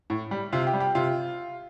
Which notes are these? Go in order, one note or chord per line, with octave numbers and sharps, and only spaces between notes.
A2
G3
C3 F4
G4
G3
G4
C3 F4